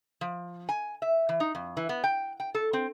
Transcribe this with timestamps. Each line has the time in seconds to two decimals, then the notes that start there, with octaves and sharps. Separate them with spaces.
0.21 F3
0.69 G#5
1.02 E5
1.29 E3
1.40 D#4
1.55 F2
1.77 E3
1.89 B3
2.04 G5
2.40 G5
2.55 A4
2.73 C4